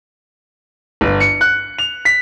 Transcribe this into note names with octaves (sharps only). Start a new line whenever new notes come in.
G1
C#7
F#6
F7
B6